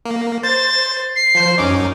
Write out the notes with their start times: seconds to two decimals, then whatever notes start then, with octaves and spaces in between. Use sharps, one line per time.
0.05 A#3
0.43 C5 A6
1.16 C7
1.35 F3 C5
1.58 F#2 C#4 D#4 D6